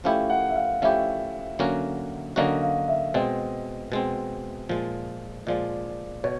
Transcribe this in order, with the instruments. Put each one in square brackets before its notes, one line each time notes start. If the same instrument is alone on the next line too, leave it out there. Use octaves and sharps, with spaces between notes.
[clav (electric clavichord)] F3 A3 C#4 E4 G4 [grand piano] F5
[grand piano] F#5
E5
F5
[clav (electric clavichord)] F3 A3 C#4 E4 G4 [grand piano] E5
[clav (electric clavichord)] D3 F#3 A#3 C#4 F#4
[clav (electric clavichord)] D3 F#3 A#3 C#4 F#4 [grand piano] D#5
[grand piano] F5
E5
[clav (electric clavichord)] B2 G#3 C4 [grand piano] D#5
[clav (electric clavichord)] B2 G#3 C4
A#2 F3 G#3
[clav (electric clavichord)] A#2 F3 G#3 [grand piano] D5
[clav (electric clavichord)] B2 [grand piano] C#5